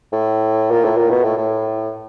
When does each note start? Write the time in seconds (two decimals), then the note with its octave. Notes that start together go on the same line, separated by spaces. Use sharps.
0.13 A2
0.71 A#2
0.85 A2
0.97 A#2
1.10 B2
1.24 A2
1.37 A2